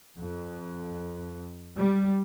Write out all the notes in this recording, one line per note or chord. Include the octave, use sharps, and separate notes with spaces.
F2
G3